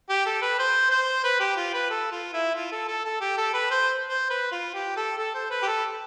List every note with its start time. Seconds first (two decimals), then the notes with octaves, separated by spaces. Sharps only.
0.09 G4
0.26 A4
0.42 B4
0.59 C5
0.91 C5
1.24 B4
1.40 G4
1.56 F4
1.74 B4
1.90 A4
2.12 F4
2.33 E4
2.55 F4
2.72 A4
2.88 A4
3.04 A4
3.20 G4
3.37 A4
3.54 B4
3.71 C5
4.09 C5
4.30 B4
4.52 F4
4.74 G4
4.97 A4
5.18 A4
5.34 C5
5.50 B4
5.62 G4
5.67 A4